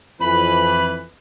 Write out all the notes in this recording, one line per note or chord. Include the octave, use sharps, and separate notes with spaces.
F2 E3 B4 B5